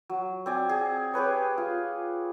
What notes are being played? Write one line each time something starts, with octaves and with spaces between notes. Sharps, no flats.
F#3
C4 D5 G#5
G#4
G4 G#4 B4 C#5
F4